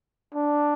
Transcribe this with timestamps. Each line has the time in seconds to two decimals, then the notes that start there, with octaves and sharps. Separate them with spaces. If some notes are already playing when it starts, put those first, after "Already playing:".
0.34 D4